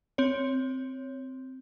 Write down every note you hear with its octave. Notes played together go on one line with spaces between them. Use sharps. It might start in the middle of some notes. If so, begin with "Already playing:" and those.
C4 C#5